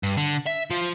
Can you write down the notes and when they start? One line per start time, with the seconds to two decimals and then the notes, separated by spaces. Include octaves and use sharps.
0.03 G2
0.17 D3
0.46 E5
0.70 F3